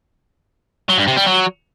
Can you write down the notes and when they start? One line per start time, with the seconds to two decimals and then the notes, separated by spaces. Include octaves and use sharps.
0.90 F#3
0.99 G2
1.08 C3
1.17 G3
1.26 F#3